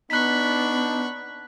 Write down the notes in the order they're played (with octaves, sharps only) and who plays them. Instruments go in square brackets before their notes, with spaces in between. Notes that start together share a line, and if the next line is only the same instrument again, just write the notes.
[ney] B3 [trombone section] D4 D#4 [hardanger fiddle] B5 C#6 [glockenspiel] F#6 B6